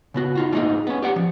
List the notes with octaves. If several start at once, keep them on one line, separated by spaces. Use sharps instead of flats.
C#3 B3 F#4
D#4 F4 F#4
G3 A3 A#3 D#4 G#4 D#5
B3 C#4
G4 D5 F#5
F3